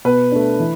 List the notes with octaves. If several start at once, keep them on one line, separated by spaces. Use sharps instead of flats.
B2 B4
A3 D4
E3